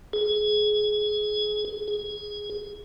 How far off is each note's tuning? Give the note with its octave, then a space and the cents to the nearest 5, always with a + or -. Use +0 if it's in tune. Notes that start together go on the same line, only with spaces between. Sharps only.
G#4 +20
G#4 -5